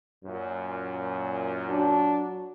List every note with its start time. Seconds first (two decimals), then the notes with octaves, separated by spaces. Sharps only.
0.24 F#2 A#2
1.69 F#3 D4 F#4